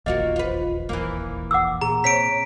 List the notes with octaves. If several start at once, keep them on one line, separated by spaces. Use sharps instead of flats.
E1 A#1 D#2 A#3 F4 F#4 D#5
F4 B4
E3 A#3
F#5 D6 E6
A#2 G#4 A#5
C3 C#5 B6 D7